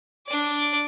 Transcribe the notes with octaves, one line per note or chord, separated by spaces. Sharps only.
D4 D5